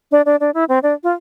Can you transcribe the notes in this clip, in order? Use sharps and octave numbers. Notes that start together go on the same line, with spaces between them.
D4
D4
D4
E4
C4
D4
F4